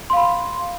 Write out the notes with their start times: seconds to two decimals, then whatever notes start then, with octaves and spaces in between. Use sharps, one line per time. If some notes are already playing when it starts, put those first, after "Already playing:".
0.10 C6
0.13 F5
0.16 B5